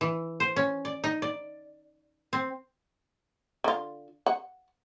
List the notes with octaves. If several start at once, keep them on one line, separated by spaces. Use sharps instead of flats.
E3
C5
C#4
D5
D#4
D5
C4
D3 F4
F#5